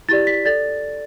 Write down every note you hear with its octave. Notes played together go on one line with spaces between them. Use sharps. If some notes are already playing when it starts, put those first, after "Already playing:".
E4 G4 D5 A6
B6
A4 D5 A6